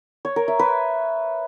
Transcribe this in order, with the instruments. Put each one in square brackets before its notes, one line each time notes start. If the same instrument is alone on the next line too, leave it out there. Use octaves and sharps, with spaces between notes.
[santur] C#5
A#4
E5
B4